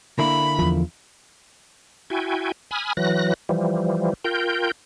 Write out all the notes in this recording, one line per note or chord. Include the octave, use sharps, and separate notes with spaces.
D3 A#3 E4 B5
E2 F3
E4 F#4 G5 G#5
G#5 B5 D#6 F6
E3 F#3 F#6 A#6
E3 F3 G3
F4 A#4 G5 G6